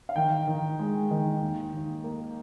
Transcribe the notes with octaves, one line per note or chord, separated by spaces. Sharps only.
F5
D#3 G5
D#3
G#3
D#3
D#2
D#2
A#3